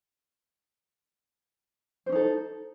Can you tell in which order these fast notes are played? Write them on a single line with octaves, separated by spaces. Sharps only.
C5 C#4 D#4 A4